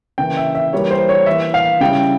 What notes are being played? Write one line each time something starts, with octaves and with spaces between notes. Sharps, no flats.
C#3 E3 A#3 G5
E5
E5
E3 G3 A#3 C#5
C5
C#5
E3 A#3 E4 E5
F5
C#3 G3 C#4 E4 G5